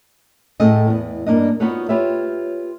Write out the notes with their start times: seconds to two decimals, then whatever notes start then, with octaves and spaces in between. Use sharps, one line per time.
0.60 A2 A3 C4 G#4 A4 D#5
0.87 E2 B3
1.26 G2 A#3 D4 D#5
1.60 B3 D#4 F4 F#4 B4 C#5
1.89 F4 G4 B4 C#5 E5